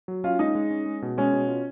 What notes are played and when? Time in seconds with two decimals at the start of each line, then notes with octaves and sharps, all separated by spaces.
0.08 F#3
0.24 C#4 F4
0.39 G#3 D#4
0.55 G#3
0.71 C#4
0.86 G#3
1.02 B2
1.18 G#3 C#4
1.33 B2
1.48 F4